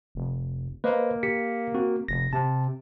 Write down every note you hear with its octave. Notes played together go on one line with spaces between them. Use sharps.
F1
A#3 B4 C5 D#5
G4 B6 C#7
C4 F#4
F1 A#6
C3 A5